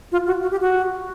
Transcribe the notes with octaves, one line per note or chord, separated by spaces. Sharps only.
F4
F#4
F#4
G4
F#4